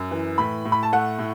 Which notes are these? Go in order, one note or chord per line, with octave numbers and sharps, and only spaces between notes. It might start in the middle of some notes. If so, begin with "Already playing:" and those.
Already playing: F#2
E3
A2 B5
A2
B5
A5
A3 F#5
A2